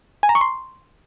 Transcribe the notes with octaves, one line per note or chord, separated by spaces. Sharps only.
G#5
A#5
C#6
C6